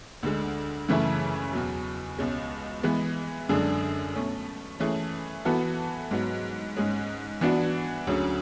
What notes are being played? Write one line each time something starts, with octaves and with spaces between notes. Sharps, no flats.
D2 D3 G#3
F#2 C#3 E3 A3 E4
E2 B2 F#3
C#2 B2 G#3 C#4
E3 G#3 B3
F#2 D3 G#3 D4 G#4
B2 A3 C#4
E3 A3 C#4 G#4
E3 B3 F#4 A4
G#2 F#3 B3
G#2 G#3 C#4 G#4
E3 B3 D4 F#4
D2 D3 F#3 C#4 G#4